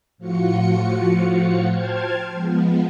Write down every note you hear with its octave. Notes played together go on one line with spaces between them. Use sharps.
A2 F3 F4 F#4 C#7
C5 G5 A5 F6 G#6
F3 G#3 B3